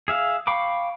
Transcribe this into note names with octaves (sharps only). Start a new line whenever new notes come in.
G#4 E5 F5
F5 G5 B5 C#6 D6